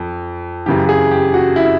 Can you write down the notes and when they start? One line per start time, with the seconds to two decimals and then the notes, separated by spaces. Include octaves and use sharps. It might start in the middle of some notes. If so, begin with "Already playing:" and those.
Already playing: F2
0.66 F#2 C#3 E3 G4
0.89 G#4
1.11 G4
1.34 F#4
1.56 E4